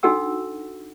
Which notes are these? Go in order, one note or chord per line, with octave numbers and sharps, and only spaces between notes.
D4 D#4 F#4 A4 F#5 E6